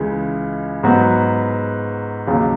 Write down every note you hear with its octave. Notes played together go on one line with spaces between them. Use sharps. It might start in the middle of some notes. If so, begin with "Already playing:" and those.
Already playing: C#2 C#3 E3 G#3
G#2 F#3 B3 F#4
D#2 C#3 F#3